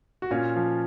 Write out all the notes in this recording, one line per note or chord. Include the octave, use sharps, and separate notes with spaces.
F#4
A#2 C#4 F4
F3